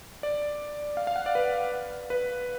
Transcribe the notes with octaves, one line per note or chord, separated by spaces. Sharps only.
D5
F5
F5
F#5
D5
B4
B4